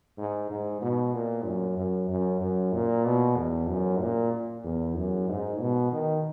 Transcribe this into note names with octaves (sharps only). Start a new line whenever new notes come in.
G#2
G#2
B2
A#2
F#2
F#2
F#2
F#2
A#2
B2
E2
F#2
A#2
E2
F#2
G#2
B2
D#3